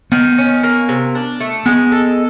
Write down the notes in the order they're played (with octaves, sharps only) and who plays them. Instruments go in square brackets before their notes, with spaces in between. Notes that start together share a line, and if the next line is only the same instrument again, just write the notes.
[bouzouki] D#3 [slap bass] B3
[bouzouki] C#4
A#3
C3
D4
A3
[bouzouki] G#3 [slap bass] B3
[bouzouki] A4